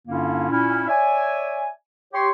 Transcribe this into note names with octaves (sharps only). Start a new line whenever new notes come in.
G2 D3 A#3 C#4 E4 F4
A#2 C#4 E4
C#5 D5 E5 G#5
G4 C#5 C6